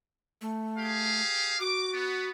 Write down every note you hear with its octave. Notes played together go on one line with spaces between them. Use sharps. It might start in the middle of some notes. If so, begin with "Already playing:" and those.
A3
G4 G#4 F5
F#4 D6
B3